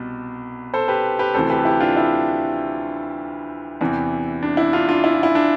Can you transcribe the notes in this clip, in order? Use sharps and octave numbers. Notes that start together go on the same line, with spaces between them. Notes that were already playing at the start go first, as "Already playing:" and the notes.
Already playing: C2 B2
A4 C5
G4 B4
G4 B4
D2 C3 E3 A4 C5
G4 B4
A4
E4 G4
D4 F4
E4
E2 C3 E3
D4
E4
D4 F4
D4 F4
E4
F4
E4
D4